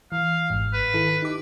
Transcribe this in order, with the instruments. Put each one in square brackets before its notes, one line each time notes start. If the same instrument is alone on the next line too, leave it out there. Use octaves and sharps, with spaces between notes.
[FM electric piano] E3 [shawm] F5
[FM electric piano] G#1 G#2
[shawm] B4
[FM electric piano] D#3 E4 A4
D#4 G4 D6